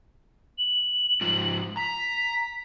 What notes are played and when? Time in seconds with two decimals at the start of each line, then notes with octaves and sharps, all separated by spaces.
0.58 F#7
1.21 G#2 F3
1.77 A#5 B6